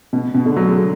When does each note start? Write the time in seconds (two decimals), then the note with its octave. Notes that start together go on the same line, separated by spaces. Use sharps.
0.13 B2
0.34 B2
0.46 D3
0.56 F#3
0.68 G#3